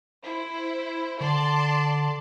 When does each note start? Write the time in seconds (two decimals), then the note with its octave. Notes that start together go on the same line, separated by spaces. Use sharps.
0.23 E4 C5
1.21 D3 D5 A5 C6